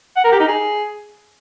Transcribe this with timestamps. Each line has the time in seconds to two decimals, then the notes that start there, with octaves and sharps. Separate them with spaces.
0.17 F#5
0.24 A#4
0.32 G4
0.40 D#4
0.48 G#4